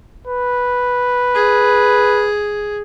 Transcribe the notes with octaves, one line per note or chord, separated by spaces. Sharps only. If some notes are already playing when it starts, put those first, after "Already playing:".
B4
G#4